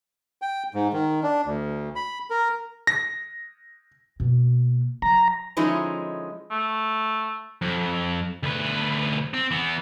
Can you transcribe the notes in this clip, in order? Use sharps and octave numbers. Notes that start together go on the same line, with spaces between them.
G5
G#2
D#3
D4
D2
B5
A#4
A#6
B2 A#3
F#3 A#5
D3 F3 G#3 C#4 D#4 E4
A3
F2
D2 B4
C4
E3 B3